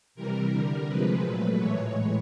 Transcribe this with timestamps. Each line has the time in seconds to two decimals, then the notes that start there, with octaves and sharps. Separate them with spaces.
0.15 C3 E3 G3 A#4
0.51 D3 G3
0.88 C3 F3 G#3 B4
1.23 A#2 F#3 A3
1.59 A2 E3 G#3 C#5